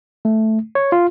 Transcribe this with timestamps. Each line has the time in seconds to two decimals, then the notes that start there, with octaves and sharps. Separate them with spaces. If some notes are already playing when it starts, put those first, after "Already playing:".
0.25 A3
0.75 C#5
0.92 F4